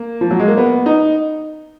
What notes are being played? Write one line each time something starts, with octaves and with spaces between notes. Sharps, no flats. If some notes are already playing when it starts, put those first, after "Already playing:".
Already playing: A#3
F3
F#3
G#3
A#3
B3
D#4